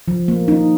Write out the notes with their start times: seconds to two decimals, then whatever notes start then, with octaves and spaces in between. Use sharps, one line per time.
0.08 F3
0.28 A#3
0.48 D#4